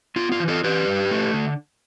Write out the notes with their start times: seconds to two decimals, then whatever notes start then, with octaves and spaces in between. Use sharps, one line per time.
0.16 B3 F4
0.32 F4
0.40 E3
0.48 F4 A4
0.64 E3 G4 B4
0.88 G2
1.11 A3
1.34 D3